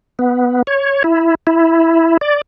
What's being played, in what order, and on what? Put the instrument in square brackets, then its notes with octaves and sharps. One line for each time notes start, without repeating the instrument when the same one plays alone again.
[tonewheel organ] B3
C#5
E4
E4
D5